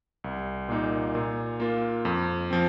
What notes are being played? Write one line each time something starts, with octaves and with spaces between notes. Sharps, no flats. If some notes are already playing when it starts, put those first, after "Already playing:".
C2
A#2 A#3 D#4
A#2
A#3 F4
F2
F3 C4